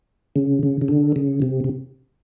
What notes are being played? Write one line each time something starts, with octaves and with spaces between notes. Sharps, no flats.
C#3
C#3
C#3
D3
C#3
C3
C3